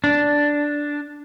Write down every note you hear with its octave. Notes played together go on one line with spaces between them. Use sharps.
D4